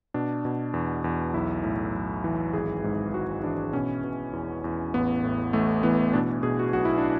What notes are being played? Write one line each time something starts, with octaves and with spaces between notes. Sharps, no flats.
B2 D4
B2
E2
E2
B1 E4
A2
B1
E3
G#1 G#4
G#2
G#1 F#4
E3 D4
B2 C#4
B2
E2
E2
A1 B3
A2
A1 A3
E3 B3
B2 D4
B2 G#4
F#4
B1 F#4
E4
D4